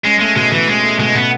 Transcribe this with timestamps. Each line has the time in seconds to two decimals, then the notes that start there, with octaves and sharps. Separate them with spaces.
0.05 G#3 C#4
0.20 G#3 A3
0.36 B2 G#3
0.51 B2 E3
0.67 G#3 C#4
0.83 A3
0.99 B2 G#3
1.15 B2 B3